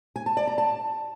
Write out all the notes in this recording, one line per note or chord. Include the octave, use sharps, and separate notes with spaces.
G#5
A5
D5
A#5
A5